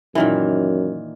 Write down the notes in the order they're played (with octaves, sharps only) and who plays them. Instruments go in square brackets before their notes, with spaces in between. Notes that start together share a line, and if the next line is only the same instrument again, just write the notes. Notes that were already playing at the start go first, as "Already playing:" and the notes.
[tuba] F#2 [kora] A#2 D#3 E3